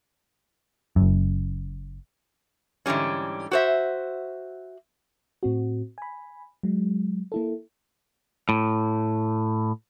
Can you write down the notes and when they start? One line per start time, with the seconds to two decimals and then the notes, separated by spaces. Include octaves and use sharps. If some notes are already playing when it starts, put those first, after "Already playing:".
0.96 F#1 F#2
2.86 G#2 D3 E3 G3 C#4
3.51 F#4 C5 E5
5.43 A2 C4 F#4
5.98 G#5 B5
6.63 F#3 G#3
7.32 A#3 E4 A4
8.49 A2